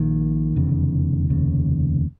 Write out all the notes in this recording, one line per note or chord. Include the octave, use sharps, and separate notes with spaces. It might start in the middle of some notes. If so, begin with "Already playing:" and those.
Already playing: A#1 A#2 D#3
F1 E2 C#3
F1 D#2 C#3